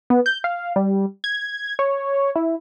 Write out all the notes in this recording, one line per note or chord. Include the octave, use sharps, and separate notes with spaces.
B3
G6
F5
G3
G#6
C#5
E4